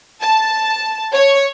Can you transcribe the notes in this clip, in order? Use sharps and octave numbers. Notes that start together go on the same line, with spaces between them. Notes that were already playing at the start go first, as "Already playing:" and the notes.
A5
C#5